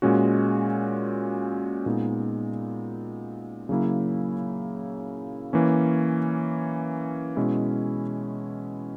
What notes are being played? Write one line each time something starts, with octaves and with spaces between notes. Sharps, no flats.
A#2 G#3 C#4 F#4
A#2 G#3 B3 D#4
C#3 F#3 A#3 E4
E3 A#3 C#4
B2 G#3 C#4 E4